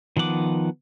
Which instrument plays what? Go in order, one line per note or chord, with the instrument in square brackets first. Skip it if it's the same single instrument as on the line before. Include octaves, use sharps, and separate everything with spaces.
[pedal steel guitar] D#3 F3 B3 F#5 D6